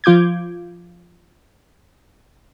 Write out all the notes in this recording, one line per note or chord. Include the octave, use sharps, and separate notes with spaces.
F3 F4 D6 G6 G#6